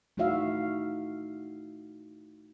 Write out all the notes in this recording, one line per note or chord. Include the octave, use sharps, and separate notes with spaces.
A3 D#4 E4 F#4 E5 F5